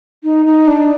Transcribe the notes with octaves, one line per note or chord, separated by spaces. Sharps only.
D#4
D#4
D4